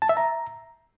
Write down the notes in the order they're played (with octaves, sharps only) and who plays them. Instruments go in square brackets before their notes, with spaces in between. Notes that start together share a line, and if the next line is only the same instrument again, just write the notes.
[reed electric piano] A5
E5
A#5